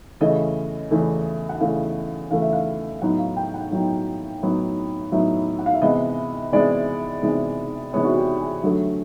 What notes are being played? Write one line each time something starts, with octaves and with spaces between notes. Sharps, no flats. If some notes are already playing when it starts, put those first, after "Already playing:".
E2 C#3 E3 A3 D#5
E2 C#3 E3 A3
F#5
E2 C#3 E3 A3 F5
E2 C#3 E3 A3 F5
E5
F5
A2 F#3 B3 D#4 F#5
F5
G5
F#5
A2 F#3 B3 D#4
A2 F#3 B3 D#4
A2 F#3 B3 D#4 E5
F#5
F5
E5
C3 E3 G#3 B3 D#5
C3 E3 G#3 B3 D5
C3 E3 G#3 B3
C3 E3 G#3 B3 C#5
F#4
G4
G#4
D3 F#3 A3 G4